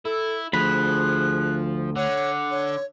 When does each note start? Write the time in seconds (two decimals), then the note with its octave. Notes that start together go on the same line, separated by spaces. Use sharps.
0.05 E4 A4
0.53 D2 F3 G#4 B5 F#6
1.96 D3 C#5 F#5
2.50 C#5